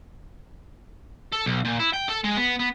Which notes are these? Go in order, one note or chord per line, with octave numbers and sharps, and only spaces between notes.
A4
B1
A#2
E4
G5
A4
G#3
B3
B3